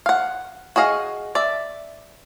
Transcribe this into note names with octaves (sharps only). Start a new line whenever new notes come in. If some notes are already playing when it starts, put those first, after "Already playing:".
F5 F#5
F#4 G#4 D#5 F5
D5 E5